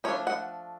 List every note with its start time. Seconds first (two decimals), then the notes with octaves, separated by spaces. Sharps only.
0.04 F3 A3 D4 C#5
0.27 F#5